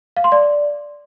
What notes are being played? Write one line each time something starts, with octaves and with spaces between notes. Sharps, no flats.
F5
C6
D5